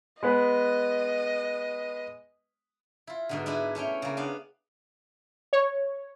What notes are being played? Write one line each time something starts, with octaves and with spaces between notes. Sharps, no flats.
G#3 B3 B4 D#5
E4 F4
G#2 B2 D3
D4 E4 B4 E5 G#5
A3 C#4 C#5 G5
C#3 A#3
B3 D4 F5
C#5